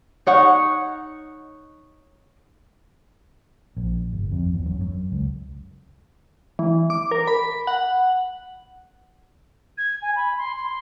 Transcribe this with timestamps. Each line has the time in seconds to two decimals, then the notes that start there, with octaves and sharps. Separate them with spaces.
0.26 D#4 C#5 F#5
3.77 A#1
4.13 G1
4.32 F2
4.54 E2
4.65 F#2
4.81 F#2
5.12 C#2
6.59 E3
6.90 D6
7.11 A#4
7.27 B5
7.67 F#5
9.78 G#6
10.02 G#5
10.16 B5
10.38 C6
10.57 C6